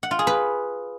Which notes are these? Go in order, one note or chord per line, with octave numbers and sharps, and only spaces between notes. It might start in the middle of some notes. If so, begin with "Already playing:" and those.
F#5
F4
G#4
B4